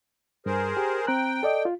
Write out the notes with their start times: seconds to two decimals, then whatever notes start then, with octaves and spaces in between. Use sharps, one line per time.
0.46 G2 G#4 A#4 C5
0.77 G4
1.07 C4 G5 A#5 F#6
1.43 A4 D5 D#5
1.65 F4